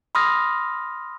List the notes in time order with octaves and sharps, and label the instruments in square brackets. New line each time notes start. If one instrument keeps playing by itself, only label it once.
[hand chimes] B5 C6 D#6 F6 A#6